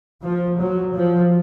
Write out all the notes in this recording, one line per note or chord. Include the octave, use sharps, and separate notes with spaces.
F3
F#3
F3